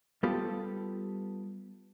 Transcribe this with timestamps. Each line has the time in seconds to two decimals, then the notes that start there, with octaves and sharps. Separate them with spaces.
0.23 G3 B3 F4 G4 A4